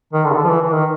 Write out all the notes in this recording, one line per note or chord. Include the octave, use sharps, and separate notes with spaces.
D#3
D3
C#3
D3
F3
E3
E3
D#3